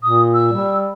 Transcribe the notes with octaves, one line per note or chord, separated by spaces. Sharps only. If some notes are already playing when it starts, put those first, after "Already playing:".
A#2 D#6
E6
G3